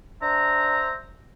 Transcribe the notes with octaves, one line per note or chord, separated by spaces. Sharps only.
D4 C5 E5 A#5